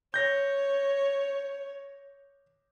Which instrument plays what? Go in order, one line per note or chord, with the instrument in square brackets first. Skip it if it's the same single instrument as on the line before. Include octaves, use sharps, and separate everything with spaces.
[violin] C#5 [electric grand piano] G6 A#6